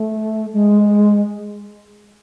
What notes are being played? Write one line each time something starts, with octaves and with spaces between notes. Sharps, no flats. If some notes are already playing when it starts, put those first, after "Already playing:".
Already playing: A3
G#3